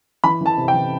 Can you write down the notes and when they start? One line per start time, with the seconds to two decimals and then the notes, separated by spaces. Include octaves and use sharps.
0.24 E3 B5
0.41 E3 A5
0.57 C3
0.68 G5
0.74 E3